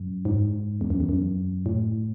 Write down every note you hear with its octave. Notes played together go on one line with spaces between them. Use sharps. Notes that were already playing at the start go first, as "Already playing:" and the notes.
Already playing: F#2
G#2
E2
F#2
E2
F#2
A2